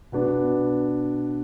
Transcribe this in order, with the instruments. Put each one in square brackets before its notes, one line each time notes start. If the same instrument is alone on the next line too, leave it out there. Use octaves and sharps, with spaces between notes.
[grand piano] B2 B3 D4